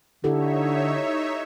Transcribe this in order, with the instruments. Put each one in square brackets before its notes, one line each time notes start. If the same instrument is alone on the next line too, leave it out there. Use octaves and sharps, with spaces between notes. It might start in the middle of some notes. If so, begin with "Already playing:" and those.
[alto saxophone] D3 [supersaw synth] D#4 C#5 E5 [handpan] E4 G4 A4